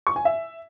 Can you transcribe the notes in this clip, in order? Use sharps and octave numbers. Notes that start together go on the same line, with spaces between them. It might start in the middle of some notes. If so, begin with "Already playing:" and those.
C#6
G#5
E5